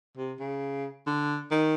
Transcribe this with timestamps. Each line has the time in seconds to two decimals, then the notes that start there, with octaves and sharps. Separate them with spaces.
0.17 C3
0.40 C#3
1.07 D3
1.51 D#3